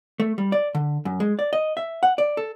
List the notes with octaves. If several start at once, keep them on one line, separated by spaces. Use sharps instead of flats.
A3
G3
D5
D3
F#2
G#3
D5
D#5
E5
F#5
D5
A4